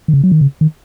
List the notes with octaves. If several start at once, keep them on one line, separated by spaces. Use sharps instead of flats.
D#3
C#3
F#3
D#3
C#3
D#3